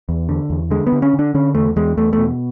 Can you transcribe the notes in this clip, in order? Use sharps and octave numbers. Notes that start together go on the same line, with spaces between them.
E2
D3
E2
D3 G#3
B3
D3
C#4
D3
D4
D3 C#4
E2 A3
E2 G#3
E2 A3
B2 A3